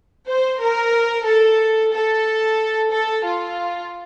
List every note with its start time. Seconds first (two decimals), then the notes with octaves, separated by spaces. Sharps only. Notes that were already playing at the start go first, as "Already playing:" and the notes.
0.27 C5
0.60 A#4
1.25 A4
1.92 A4
2.91 A4
3.24 F4